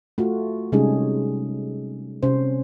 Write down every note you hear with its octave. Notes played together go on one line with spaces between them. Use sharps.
A3 F4 F#4
C3 G3 G#3 C#4 D#4 G#4
C3 C#4 C5